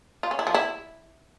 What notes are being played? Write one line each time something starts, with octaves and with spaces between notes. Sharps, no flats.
F4
C#4
E4
F3
E4